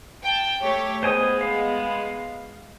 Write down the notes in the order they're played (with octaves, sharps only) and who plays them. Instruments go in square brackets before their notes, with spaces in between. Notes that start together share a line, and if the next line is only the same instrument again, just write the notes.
[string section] G5 A5
A3 G4 C#5
[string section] G#3 B3 [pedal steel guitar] C5 G#5 D#6
[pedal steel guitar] F5